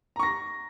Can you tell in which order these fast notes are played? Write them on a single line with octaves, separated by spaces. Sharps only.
A#5 C#6 A#6